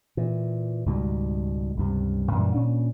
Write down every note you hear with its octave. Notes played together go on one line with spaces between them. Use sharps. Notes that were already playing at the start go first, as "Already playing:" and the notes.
A#2 E3
C#2 G#2 B2 G3
C#2 G2 C3
F#2 A#2 E3 G3
A#2 C#4 D4